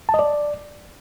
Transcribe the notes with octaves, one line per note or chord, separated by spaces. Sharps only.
A5
D#5
D5